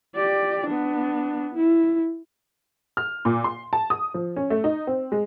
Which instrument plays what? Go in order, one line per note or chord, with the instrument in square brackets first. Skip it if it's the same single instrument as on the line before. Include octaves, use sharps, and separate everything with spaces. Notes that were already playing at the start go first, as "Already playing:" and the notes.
[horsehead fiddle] G4 D5
B3 D4
E4
[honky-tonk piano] F6
A#2
C6
A5
D#6
F3
C#4
A3
D#4
C4
G#3